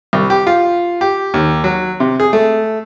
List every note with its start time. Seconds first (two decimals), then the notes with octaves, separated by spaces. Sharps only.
0.13 C2
0.30 G4
0.47 F4
1.01 G4
1.34 D#2
1.64 F#3
2.00 C3
2.20 G#4
2.33 A3